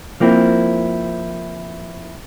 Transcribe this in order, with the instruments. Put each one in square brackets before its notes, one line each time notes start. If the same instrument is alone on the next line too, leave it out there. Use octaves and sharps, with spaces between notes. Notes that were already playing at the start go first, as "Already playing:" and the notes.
[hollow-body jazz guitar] F3 A#3 C4 E4